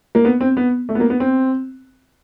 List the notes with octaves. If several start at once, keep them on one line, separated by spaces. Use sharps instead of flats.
A#3
B3
C4
B3
A3
B3
A#3
B3
C4